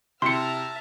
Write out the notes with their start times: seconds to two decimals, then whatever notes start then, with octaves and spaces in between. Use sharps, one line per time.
0.22 C3 E4 E5 A5 A#5 C6 F6 C#7